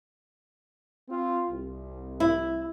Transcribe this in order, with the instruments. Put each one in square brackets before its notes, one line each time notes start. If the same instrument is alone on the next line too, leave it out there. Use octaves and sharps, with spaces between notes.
[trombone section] C4 F4
C2
[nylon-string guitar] E4